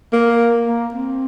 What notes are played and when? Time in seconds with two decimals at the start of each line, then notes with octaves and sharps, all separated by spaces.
0.13 A#3
0.67 A#3
0.94 C4